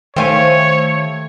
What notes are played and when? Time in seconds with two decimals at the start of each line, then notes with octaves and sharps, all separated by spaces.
0.16 D#3 A3 G4 C5 C#5 F5 G#5